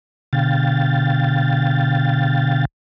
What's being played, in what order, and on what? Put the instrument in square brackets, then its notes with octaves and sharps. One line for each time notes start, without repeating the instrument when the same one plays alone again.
[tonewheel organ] B2 D3 F5 G5 A6